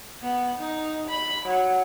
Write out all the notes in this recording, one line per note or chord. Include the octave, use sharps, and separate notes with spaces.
B3
D#4
B5
F#3